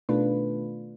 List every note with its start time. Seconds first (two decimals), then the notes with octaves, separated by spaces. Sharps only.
0.09 B2 D#3 A3 D4 F4 B4